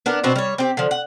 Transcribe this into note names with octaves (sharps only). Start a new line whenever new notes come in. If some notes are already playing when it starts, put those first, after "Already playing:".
B3 D4 A#4
B2 C4 D4 F#4
G3 C#5
C4 G4
D3 F3
F#5